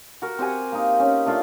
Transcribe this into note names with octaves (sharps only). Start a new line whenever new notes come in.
F#4 A#4
C4 G4 F#5 G#5
A#3 D#4
C#4
A3 D4 F4 F5